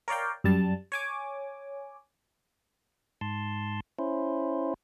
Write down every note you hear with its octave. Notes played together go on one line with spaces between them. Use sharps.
A#4 C#5 D5 F5 G5
F#2 G3 A5
C#5 G#5 D6
G#2 A5 C6
C#4 E4 C5